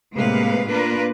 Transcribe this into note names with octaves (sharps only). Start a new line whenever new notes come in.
A2 C3 G#3 A#3 B4 F5
A#3 D4 F4 A#4 B4